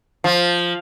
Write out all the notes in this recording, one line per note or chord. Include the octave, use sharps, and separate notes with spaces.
F3